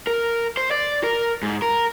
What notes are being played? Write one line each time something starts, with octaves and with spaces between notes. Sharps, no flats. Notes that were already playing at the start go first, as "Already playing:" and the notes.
A#4
C5
D5
A#4
G#2
A#4